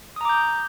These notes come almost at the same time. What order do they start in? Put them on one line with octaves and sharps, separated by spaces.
D#6 A#5 D6 G6